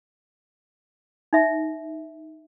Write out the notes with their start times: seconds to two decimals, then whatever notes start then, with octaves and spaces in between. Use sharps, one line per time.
1.33 D#4 E5